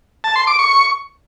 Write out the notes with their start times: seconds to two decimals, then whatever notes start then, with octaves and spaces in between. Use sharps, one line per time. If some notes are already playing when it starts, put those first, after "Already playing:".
0.24 A5
0.36 C6
0.47 D6
0.59 C#6